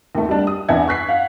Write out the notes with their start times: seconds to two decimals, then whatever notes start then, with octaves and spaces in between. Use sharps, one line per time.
0.15 D#2 A3
0.29 G3 D4
0.47 D#6
0.69 E2 D4 E5 F#5 G#6
0.88 C#6 F#6 B6 C7
1.09 F5 F#5